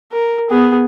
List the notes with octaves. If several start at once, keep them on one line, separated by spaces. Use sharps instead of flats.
A#4
B3 G#4